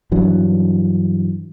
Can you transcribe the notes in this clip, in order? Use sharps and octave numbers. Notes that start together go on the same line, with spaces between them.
G2 E3 F#3 D4